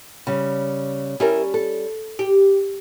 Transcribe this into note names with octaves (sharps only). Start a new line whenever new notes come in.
C#3 G3
G3 C#4 E4 A#4
A4
G4